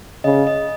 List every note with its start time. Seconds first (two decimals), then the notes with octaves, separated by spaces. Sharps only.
0.24 C#3 D#5
0.47 D#5